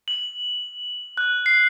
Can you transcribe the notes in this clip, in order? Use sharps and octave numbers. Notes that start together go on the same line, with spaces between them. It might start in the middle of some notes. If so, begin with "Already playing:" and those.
F#7
F#6
C7